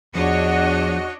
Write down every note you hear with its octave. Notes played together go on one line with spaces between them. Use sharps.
E2 F3 D4 F#4 C#5 D#5 F#6